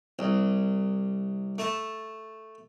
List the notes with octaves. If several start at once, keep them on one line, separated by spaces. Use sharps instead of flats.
C2
A3 A5